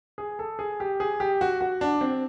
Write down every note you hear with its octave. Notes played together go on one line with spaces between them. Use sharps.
G#4
A4
G#4
G4
G#4
G4
F#4
F#4
D4
C4